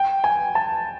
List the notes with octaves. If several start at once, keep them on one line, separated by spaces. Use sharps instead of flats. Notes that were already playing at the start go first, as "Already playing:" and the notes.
Already playing: G5
G#5
A5